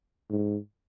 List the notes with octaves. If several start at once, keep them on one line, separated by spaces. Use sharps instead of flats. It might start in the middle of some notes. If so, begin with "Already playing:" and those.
G#2